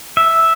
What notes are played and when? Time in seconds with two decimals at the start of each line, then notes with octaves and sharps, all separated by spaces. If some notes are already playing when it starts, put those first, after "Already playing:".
0.17 E5